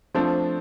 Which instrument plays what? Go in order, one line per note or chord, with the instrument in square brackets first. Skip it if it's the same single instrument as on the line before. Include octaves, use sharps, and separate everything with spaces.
[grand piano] F3 A3 D4 F4 [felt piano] C4